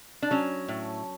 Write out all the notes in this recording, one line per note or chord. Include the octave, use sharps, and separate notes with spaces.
D4
F#3 C#4
A2